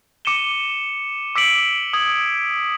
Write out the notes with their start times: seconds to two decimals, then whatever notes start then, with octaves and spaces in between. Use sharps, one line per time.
0.25 D6 C#7 D#7 E7 G7
1.35 D6 E6 B6 C#7 D7 F#7
1.93 D#6 G#6 F#7